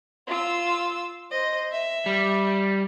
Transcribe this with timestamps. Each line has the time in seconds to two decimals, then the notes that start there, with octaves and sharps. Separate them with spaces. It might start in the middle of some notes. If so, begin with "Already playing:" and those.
0.27 F4 E6
1.31 C5 D#5
1.72 E5
2.06 G3